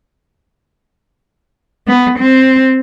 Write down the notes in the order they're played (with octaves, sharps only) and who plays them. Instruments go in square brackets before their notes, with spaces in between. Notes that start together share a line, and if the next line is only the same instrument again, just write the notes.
[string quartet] B3
C4